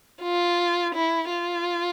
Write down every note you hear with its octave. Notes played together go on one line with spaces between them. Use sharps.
F4
E4
F4